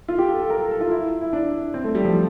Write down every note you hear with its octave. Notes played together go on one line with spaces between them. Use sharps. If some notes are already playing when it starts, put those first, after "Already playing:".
F4
G4
A4
A4
A#4
A4
A4
F4
E4
E4
D4
C4
A3
G3
F3